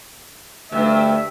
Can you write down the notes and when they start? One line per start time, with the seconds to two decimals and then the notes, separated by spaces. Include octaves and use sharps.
0.72 D2 G2 E5